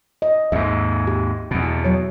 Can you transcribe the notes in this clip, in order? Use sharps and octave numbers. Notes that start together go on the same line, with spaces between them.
D#5
D#2 G#2 E5
G4
E2 B2
F#3 C#5